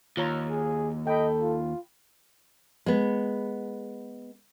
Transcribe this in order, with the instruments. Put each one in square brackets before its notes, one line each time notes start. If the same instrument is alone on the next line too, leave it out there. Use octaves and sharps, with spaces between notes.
[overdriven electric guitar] D#2 [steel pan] F4 C#5 A#5
[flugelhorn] G#4
[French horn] A4 [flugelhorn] D#5 [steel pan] G5 B5
[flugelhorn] F4
[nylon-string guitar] G#3 B3